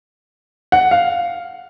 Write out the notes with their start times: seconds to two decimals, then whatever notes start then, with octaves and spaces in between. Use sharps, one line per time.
0.72 F#5
0.91 F5